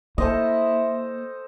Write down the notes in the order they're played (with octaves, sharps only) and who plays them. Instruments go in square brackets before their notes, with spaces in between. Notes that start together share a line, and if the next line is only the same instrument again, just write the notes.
[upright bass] A#3 [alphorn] E4 [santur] A4 C5 D#5